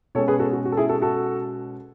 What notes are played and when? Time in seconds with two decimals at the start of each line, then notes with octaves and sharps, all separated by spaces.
0.15 B2 G#3 C#4 A4 C#5
0.28 G#4 B4
0.39 F#4 A4
0.53 F#4
0.65 F#4
0.72 A4
0.77 E4 G#4
0.89 F#4 A4
1.02 F#4 A4